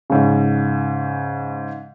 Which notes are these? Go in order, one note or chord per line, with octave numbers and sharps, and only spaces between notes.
G#2 C#3